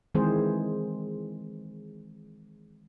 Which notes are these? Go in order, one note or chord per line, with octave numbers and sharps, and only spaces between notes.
D#3 E3 G#3 C4 G#4 C5